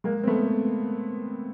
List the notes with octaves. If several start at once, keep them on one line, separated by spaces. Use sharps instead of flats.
G#3 A#3
C4
A3 B3